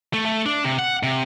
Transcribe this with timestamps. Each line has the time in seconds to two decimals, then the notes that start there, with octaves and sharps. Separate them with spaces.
0.14 A3
0.26 A3
0.46 D4
0.64 C3
0.79 F#5
1.03 C3